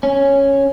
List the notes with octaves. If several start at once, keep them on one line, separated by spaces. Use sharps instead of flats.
C#4